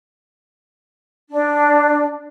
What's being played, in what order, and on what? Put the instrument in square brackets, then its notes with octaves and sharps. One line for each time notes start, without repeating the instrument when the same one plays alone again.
[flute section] D4